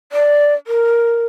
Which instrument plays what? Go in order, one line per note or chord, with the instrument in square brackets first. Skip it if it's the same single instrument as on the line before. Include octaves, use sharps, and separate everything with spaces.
[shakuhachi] D5
A#4